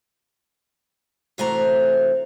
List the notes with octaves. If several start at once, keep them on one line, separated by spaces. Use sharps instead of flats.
C3 E3 A3 F#4 C5 A#5